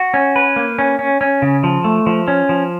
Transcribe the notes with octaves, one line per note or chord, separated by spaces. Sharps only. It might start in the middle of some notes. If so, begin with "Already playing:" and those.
Already playing: F#4
C#4
B4
A#3
C#4
C#4
C#4
C#3
F3
A3
F3
C#4
F3